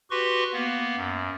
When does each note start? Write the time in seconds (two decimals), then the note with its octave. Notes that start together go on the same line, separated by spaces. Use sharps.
0.11 F#4 G4 B4 C6 C#6
0.53 A#3 B3
0.96 F#2